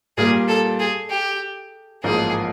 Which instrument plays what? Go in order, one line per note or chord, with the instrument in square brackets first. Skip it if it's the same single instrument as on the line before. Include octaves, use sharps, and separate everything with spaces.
[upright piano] A#2 G3 A#3 [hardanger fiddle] G#4
[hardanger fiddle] A4
G#4
G4
[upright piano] A1 G#2 F3 A#3 D#4 [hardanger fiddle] G#4